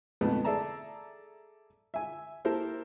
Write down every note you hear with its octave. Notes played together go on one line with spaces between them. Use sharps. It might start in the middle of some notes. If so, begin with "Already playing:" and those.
F2 G#2 A3 B3
G#4 A4 D5 E5 A5 A#5
E5 G#5
A#3 E4 G4 A4 A#4 C5